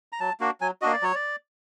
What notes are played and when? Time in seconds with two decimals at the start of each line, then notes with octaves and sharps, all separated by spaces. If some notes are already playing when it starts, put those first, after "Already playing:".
0.12 A#5
0.20 F#3 A5
0.40 A#3 D4 F#4
0.61 F#3 G#5
0.82 A#3 D4 F#4 D#5
0.93 D5
1.02 F#3 C#5
1.15 D5